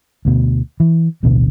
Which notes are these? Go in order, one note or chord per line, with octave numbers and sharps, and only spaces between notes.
D2 B2
E3
D1 A1 B2 D3